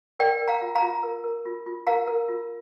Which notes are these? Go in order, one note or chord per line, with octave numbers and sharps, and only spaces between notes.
A#4 D5 G5
A#4
F5 A#5
F4
F5 A#5
F4
A#4
A#4
F4
F4
A#4 F5 A#5
A#4
F4